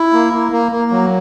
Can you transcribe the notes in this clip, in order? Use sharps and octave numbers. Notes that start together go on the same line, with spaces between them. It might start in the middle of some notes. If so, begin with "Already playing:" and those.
Already playing: E4
A#3
A#3
A#3
A#3
F#3